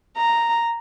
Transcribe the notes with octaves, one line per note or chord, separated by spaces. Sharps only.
A#5